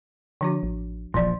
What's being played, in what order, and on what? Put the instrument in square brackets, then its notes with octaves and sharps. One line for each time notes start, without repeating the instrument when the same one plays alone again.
[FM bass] D3 [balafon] F3 D4 F#4
[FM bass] A1
[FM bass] D1 [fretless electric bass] A#1 F3 [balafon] E3 D5